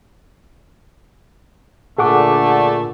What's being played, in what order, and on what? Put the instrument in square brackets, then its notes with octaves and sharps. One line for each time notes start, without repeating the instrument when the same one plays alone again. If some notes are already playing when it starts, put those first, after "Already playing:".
[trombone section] A#2 D3 [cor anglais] A3 [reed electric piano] G#4 F#5 D6